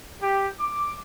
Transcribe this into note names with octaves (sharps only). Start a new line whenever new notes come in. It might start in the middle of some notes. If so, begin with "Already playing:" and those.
G4
D6